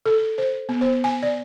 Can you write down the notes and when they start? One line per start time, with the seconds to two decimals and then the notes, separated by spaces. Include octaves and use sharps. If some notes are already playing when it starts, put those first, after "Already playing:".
0.06 A4
0.38 C5
0.69 B3
0.81 C5
1.04 G#5
1.23 D5